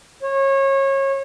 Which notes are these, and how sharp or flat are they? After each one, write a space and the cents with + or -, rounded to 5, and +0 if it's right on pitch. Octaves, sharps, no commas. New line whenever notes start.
C#5 -25